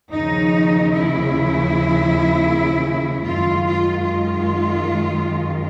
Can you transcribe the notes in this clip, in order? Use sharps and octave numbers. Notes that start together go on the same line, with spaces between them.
D#2 C#3 F3 D#4
E4
F#2 D#3 G#3 F4
F4
F4